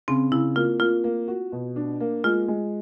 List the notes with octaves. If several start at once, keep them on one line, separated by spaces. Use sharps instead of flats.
C#3 C4
C#3 E4
A#3 F4
A#3 F4
A#3
F#4
B2
D4
A#3
G#3 F4
G#3